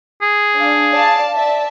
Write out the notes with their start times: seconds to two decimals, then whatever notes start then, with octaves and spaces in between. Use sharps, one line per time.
0.22 G#4
0.56 D4 F5
0.92 D5 F5 A5
1.33 D5 E5 A5